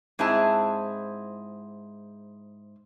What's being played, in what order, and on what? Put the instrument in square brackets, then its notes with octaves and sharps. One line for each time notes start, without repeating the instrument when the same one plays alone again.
[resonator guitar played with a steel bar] G#2 C4 E4 G#4 A5